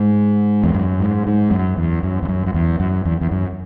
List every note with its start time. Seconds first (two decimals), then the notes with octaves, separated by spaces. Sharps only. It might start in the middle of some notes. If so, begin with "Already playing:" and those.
Already playing: G#2
0.64 E2
0.74 F#2
1.00 G#2
1.27 G#2
1.51 F#2
1.77 E2
2.03 F#2
2.23 E2
2.28 F#2
2.46 F#2
2.54 E2
2.80 F#2
3.05 E2
3.21 E2
3.31 F#2